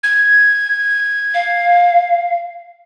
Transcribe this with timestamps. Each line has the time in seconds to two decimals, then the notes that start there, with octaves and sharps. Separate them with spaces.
0.03 G#6
1.34 F5